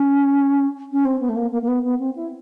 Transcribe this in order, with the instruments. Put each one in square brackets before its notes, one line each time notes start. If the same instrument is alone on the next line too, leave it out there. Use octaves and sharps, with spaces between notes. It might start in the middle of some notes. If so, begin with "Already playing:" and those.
Already playing: [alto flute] C#4
C#4
C4
B3
A3
A#3
A#3
A#3
B3
B3
C4
E4